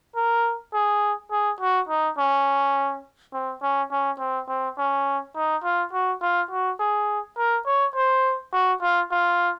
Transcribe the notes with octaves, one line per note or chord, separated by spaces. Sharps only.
A#4
G#4
G#4
F#4
D#4
C#4
C4
C#4
C#4
C4
C4
C#4
D#4
F4
F#4
F4
F#4
G#4
A#4
C#5
C5
F#4
F4
F4